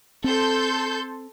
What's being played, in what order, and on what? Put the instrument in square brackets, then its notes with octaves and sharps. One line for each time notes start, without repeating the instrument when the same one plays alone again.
[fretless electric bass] C4 [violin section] A4 C6 G6